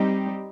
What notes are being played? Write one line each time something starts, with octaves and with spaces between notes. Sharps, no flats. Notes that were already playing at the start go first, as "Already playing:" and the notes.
Already playing: G3 C4 D#4 G4